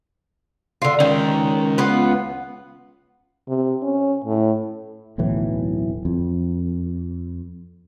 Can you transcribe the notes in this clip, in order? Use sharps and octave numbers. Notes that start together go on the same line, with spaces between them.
D3 F4
D#3 G#3 C#4
B3 F4 B4
C3
C#4
A2
D1 B1 A2 E3
F2